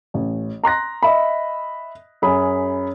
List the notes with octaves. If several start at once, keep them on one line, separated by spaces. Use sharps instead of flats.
A1
A#5 C6 F#6 A#6
D#5 E5 B5
F#2 G#4 B5